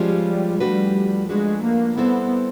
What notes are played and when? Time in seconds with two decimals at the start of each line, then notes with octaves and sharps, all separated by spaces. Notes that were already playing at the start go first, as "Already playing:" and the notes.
Already playing: F3 G3 G#3 C#4 F4
0.60 F3 G3 A3 D4 F#4 B4
1.29 F3 G#3 A3 D4 F#4 B4
1.63 A#3
1.97 G3 B3 C4 E4 A4 C5